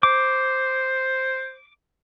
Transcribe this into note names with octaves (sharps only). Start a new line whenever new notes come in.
C5 D6